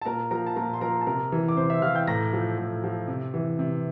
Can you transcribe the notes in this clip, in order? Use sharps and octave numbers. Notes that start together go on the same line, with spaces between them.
A5
A#2 A#4 A#5
F3 A#4 A#5
A5
A#2 A#4 A#5
C6
F3 A#4 A#5
A5
C3 A#4 A#5
E3
D6
C3 C5 C6
E5 E6
E3 F5 F6
G5 G6
A2 A#5 A#6
F3
A2
F3
C3
E3
C3